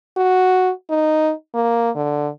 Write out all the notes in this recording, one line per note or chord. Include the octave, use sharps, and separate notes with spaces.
F#4
D#4
A#3
D3